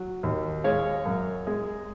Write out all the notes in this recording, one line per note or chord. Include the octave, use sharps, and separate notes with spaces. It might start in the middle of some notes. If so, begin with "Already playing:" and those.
Already playing: F#3
D#2
G#3 C#5 F5
F#2
G#3